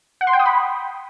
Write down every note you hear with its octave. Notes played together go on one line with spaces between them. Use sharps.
F#5
C6
G5
D#6
B5